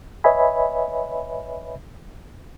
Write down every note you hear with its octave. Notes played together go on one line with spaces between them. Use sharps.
B4 C#5 D#5 E5 G#5 B5